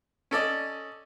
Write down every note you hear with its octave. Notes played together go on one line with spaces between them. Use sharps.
C#4 A4 D5 D#5